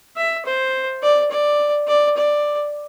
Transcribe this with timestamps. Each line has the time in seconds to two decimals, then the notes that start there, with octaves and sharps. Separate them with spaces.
0.17 E5
0.45 C5
1.02 D5
1.31 D5
1.88 D5
2.17 D5